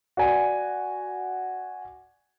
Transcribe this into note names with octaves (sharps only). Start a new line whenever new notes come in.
F#4 D5 G#5